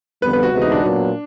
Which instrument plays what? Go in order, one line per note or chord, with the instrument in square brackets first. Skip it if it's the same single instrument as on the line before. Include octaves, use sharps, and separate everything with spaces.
[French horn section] F2 D3 G3 B3 [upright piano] B4
[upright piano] B4
F#4
[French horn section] D2 C3 E3 G#3 B3
[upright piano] D#4
D4
[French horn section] A#2 F#3 B3